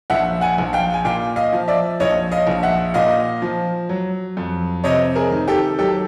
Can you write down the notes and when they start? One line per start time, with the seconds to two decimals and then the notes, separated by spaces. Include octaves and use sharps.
0.10 A#1 E5 F#5
0.41 F#5 G#5
0.58 A#1
0.73 F5 G5
0.94 G#5
1.05 A#2 F5 G5
1.36 D#5 F5
1.53 F3
1.68 D5 E5
2.00 A#1 C#5 D#5
2.32 D#5 F5
2.47 A#1
2.63 E5 F#5
2.94 A#2 D#5 F5
3.42 F3
3.89 F#3
4.37 F2
4.84 C3 C#5 D#5
5.15 G#4 A#4
5.31 D#3
5.48 G4 A4
5.79 F#3 G4 A4